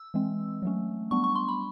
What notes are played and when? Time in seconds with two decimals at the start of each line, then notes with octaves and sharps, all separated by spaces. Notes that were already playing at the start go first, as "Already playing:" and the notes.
Already playing: E6
0.14 E3 G#3 C4
0.62 F#3 A3 C#4
1.11 G3 B3 D4 C#6
1.24 C#6
1.35 C6
1.49 B5